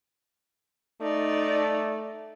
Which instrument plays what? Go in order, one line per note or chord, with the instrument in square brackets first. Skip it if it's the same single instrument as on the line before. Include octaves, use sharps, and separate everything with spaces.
[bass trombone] A3 [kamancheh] D#4 D5